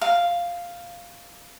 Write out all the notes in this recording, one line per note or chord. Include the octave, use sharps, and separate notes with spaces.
F5